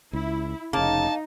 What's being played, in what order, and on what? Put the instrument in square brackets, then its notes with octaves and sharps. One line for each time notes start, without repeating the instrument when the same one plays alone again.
[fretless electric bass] C#2 [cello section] E4
[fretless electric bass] F1 C#3 [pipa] A#3 [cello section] D#4 [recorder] A5